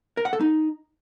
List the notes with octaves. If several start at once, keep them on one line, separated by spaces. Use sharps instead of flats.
A#4
F#5
A4
D#4